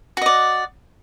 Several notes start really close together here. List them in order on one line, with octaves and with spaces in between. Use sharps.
F#4 D#5 D5